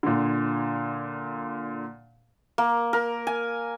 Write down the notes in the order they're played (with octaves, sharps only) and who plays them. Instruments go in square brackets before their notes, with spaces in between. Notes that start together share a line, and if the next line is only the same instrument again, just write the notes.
[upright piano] A#2 D3
[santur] A#3
A#4
G#5